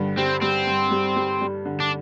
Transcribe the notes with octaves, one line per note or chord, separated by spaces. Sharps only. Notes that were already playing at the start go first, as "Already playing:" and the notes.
Already playing: G2 D3
G3 C4
G3 C4
G2
G3
G3
G3
D3
D4